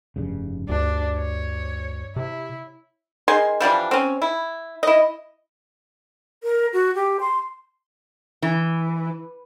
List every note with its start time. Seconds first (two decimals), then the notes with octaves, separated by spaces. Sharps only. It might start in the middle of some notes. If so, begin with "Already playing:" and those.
0.16 F1 G2 C#3
0.69 D2 G2 D4
1.18 C#5
2.16 C3 E4
3.28 D#3 G#4 G#5 C6
3.60 E3 F3 G3 D4
3.91 C4 C#4
4.22 E4
4.83 E4 D#5
6.43 A#4
6.73 F#4
6.95 G4
7.20 C6
8.42 E3